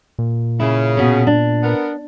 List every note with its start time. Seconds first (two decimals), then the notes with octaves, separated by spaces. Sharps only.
0.19 A#2
0.60 C#3 E4
0.97 B2 C#4
1.27 D4
1.63 B3 A#4